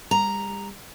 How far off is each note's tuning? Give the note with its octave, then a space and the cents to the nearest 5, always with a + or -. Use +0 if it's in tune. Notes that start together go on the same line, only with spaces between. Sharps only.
G3 +40 A#5 +0